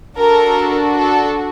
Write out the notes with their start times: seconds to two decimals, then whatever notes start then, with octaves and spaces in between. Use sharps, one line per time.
0.17 D4 F#4 A4 A#4
0.98 A4